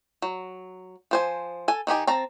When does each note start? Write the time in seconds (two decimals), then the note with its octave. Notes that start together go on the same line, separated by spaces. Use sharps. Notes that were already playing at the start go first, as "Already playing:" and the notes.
0.22 F#3
1.11 F3 C5 G#5
1.68 A4 G#5
1.87 D#3 D#4 G4 G#5
2.07 C4 A5 A#5